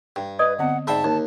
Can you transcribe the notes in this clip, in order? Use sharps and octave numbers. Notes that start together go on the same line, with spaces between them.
G2 G5
B4 D5 D#5 D#6
D3 B3 C4 F#5
G#2 D5 E5 G5 A5 B5
D#2 D#4